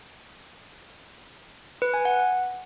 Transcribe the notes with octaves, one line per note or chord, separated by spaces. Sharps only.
B4
G#5
F#5